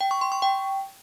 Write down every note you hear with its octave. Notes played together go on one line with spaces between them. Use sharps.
G5
C#6
C6
C#6
G5